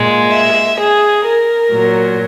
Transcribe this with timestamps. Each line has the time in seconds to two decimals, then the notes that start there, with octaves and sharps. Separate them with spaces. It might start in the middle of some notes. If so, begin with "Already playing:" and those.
Already playing: A#2 G#3
0.31 E5
0.77 G#4
1.24 A#4
1.72 A#2 F#3